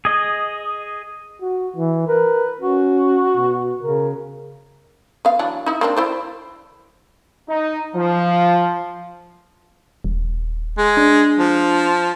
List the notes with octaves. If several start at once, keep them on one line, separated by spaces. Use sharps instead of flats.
G#4 D#5
F#4
E3
A#4 B4
C#4 F#4
B2
C#3 A#4
B3 F5
E3 F#3 D4
D#4 E4
A#3 C4 D4
E4 C5 D5
D#4
F3
D#1
G#3
D4
F3